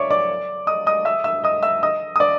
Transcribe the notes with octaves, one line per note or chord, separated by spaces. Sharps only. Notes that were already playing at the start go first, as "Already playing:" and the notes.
Already playing: C#5 D5 E5 C#6 D6
D5 D6
D#5 D#6
D#5 D#6
E5 E6
E5 E6
D#5 D#6
E5 E6
D#5 D#6
D#6
D5 D6